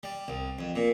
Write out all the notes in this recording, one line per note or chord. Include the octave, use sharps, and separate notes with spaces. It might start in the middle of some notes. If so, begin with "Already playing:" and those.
G3
C2
F2
A#2